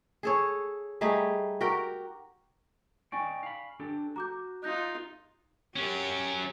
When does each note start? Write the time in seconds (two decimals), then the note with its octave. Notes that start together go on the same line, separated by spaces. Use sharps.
0.23 G#4 A4 C#5
1.01 G3 A3 D#4 G#4
1.61 F#4 G4 A#4 G5
3.12 D#4 D5 G5 G#5 C#6
3.43 F5 B5
3.80 D4 G4 A4
4.16 F#4 A#5 D6 G6
4.63 D#4 F4 F#6 G6 A#6
5.76 F#3 C#4 G4